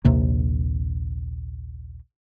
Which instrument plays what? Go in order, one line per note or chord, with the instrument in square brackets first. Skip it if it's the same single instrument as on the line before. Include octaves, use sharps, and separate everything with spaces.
[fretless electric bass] A#1 D#2 C3 A#3